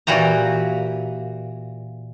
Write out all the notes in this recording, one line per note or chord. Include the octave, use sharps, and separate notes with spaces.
A#2 E3 F#4 G4 A#5